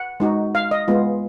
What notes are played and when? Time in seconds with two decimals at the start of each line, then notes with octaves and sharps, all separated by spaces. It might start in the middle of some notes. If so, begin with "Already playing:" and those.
Already playing: F#5
0.20 G#3 D#4 F#4
0.55 F5
0.71 D#5
0.88 G#3 B3 F4